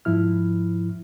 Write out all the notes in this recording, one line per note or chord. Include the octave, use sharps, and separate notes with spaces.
G#2 F3 E4 F6